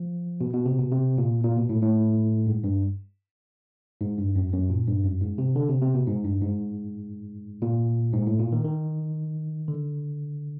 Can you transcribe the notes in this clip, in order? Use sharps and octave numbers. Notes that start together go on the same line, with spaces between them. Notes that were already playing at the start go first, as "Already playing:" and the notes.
Already playing: F3
B2
B2
C3
B2
C3
A#2
A#2
B2
A2
A2
G#2
G2
G#2
G2
F#2
F#2
A#2
G2
F#2
G#2
C3
D3
C3
C3
B2
G#2
G2
G#2
A#2
G#2
A2
A#2
D#3
D#3
D3